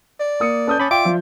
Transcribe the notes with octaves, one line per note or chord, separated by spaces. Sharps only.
D5
A#3 D#6 C#7
C#4 A4 B4 A5 D#6 G6
C#4 B5 D6 A6
F4 D5 E5 G5 D6
F3